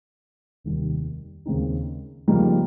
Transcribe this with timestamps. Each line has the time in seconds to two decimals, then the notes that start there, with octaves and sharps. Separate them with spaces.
0.64 F1 D#2 D#3 G3
1.46 D#2 C#3 G#3 C4 D#4
2.28 F2 C#3 G3 A#3 D#4